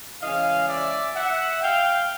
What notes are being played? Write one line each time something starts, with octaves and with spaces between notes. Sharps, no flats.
C#3 E3 G#3 C#4 D#5 F5
D5 E5
E5 F#5
F5 G5